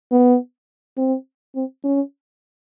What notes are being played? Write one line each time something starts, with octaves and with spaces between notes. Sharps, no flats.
B3
C4
C4
C#4